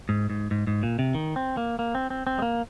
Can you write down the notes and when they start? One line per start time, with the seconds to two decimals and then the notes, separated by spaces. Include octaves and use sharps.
0.09 G#2
0.30 G#2
0.51 G#2
0.67 G#2
0.83 A#2
0.99 C3
1.15 D#3
1.36 C4
1.57 A#3
1.79 A#3
1.95 C4
2.10 C4
2.27 C4
2.38 G#3
2.42 A#3